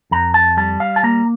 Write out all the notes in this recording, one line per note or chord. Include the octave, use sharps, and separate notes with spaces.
F2 A#5
A5
G3 A5
F5
A5
A#3 A#5